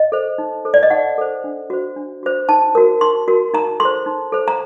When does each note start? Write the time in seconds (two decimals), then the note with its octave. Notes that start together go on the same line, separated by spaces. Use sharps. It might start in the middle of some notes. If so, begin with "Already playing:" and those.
Already playing: D#5
0.12 A4 C5
0.38 D#4
0.65 A4 C5
0.74 D5
0.83 D#5
0.90 D#4 F#5
1.18 A4 C5
1.44 D4
1.70 F#4 C5
1.96 D4
2.23 F#4 C5
2.49 D#4 A5
2.75 F#4 A#4
3.01 D#4 C6
3.28 F#4 A#4
3.54 D#4 A#5
3.80 A4 C6
3.85 C5
4.06 D#4
4.32 A4 C5
4.48 A#5